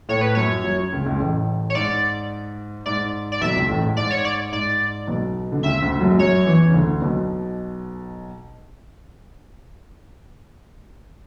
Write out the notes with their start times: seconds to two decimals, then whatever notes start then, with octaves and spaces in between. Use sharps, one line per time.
0.09 A2 A3 C#5
0.21 B4
0.35 F#2 F#3 C#5
0.64 F#2 F#3
0.92 C#2 C#3
1.06 C#2 C#3
1.19 A1 A2
1.70 C#5
1.75 G#2 D5
2.86 G#2 D5
3.32 D5
3.41 B1 B2 E5
3.55 C#2 C#3
3.69 A1 A2
3.83 G#2
3.97 G#2 D5
4.11 C#5
4.25 D5
4.52 G#2 D5
5.07 B1 B2
5.52 D3
5.63 C#2 C#3 E5
5.82 D2 D3
6.01 F#2 F#3
6.10 G#3
6.19 F#2 F#3 C#5
6.46 E2 E3
6.68 C#3
6.74 D2 D3
7.02 B1 B2